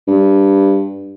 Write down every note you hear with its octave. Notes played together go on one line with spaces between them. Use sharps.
G2